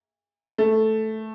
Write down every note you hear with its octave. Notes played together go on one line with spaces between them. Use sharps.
A3